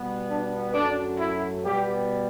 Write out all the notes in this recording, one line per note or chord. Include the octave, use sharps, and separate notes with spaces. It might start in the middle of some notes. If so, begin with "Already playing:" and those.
Already playing: B2 G3 B3
D4
F#2 F#3 A3 D4
E4
B2 G3 B3 G4